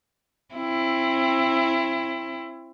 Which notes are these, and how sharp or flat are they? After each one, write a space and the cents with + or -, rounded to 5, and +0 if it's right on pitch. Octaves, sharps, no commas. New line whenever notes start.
C4 +25 E4 +20